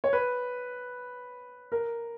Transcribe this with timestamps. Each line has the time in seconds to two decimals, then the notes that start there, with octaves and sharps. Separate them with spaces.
0.04 C#5
0.13 B4
1.72 A#4